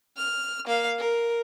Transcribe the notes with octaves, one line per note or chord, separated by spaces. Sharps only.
F6
A#3 F5
A#4